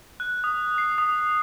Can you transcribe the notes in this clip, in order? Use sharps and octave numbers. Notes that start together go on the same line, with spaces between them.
F#6
D#6
C7
D#6